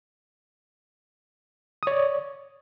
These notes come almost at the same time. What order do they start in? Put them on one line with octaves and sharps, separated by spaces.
D#6 C#5 D5